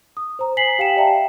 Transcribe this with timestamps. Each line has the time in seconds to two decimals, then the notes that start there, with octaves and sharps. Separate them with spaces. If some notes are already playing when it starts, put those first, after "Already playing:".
0.17 D#6
0.39 C5 A#5
0.57 C5 G#5 B6 C7 F#7
0.79 G4 F5 G5 C#7 E7
0.97 D5 E5 F5 G5 A5 A#5